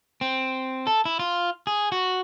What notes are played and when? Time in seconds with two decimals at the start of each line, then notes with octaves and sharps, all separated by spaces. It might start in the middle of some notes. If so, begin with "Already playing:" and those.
0.21 C4
0.87 A4
1.05 E4
1.19 F4
1.67 G#4
1.92 F#4